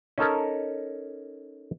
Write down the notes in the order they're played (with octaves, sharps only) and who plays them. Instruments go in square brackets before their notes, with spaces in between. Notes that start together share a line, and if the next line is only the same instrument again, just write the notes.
[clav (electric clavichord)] C#4 D#4 A4 A#4